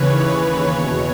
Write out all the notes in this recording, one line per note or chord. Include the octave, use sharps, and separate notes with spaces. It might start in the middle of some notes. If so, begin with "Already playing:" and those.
Already playing: D#2 C#3 E3 B4 C#5
C#5
E2 B2